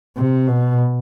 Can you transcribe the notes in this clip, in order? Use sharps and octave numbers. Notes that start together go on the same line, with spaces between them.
C3
B2